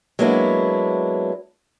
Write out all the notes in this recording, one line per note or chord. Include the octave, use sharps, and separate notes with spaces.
F#3 G#3 A#3 B3 D4 E4